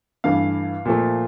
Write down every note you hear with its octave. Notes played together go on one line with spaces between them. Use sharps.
G2 E3 A3 F5
A#2 F3 A3